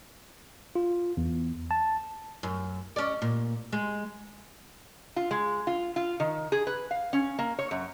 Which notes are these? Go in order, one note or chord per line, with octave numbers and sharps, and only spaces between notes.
F4
E2
A5
F#2
C#4 D5
A#2
G#3
F4
G#3
F4
F4
D#3
G#4
B4
F5
C#4
A#3
C#5
F#2